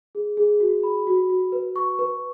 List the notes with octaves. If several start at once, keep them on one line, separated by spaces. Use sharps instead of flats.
G#4
G#4
F#4
B5
F#4
F#4
B4
C#6
B4